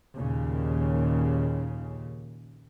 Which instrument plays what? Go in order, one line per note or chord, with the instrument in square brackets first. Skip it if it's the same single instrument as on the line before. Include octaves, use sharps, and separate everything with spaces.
[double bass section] D#2 A#2 C#3